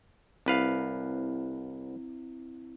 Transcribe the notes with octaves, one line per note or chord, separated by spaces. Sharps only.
C2 C4 E4 B4 F5